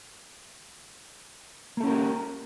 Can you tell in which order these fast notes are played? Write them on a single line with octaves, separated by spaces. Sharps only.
A#3 A4 C#4 A#4 G4